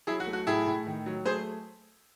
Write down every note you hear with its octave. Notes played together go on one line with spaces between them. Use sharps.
F#3 E4 G#4
F#4
A3
F#4
A2 E4 G#4
A2
D#3
F#3
A3 G#4 C5